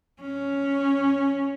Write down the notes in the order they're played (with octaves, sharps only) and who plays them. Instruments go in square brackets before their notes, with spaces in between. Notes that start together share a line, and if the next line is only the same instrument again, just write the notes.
[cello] C#4